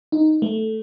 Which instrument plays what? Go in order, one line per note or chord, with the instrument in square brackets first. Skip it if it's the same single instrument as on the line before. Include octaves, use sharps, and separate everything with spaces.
[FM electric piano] D#4
A3